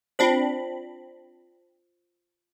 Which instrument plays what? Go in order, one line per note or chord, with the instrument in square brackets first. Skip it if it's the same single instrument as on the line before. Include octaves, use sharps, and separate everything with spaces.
[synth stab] C4 D4 B5 [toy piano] F4 C5